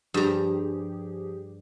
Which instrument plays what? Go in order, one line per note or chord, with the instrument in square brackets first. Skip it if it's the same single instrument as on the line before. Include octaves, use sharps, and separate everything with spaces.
[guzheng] G2 A#5 [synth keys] F3 G4 G#4